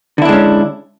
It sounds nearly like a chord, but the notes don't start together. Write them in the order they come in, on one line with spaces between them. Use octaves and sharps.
D3 E4 D4 G#3 C#4